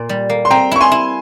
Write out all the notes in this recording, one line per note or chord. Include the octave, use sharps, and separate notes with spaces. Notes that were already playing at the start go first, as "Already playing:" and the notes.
Already playing: A#2
G3
A#3
C6
C4 G5 A#5
E4 C#6
G#5 C6
E4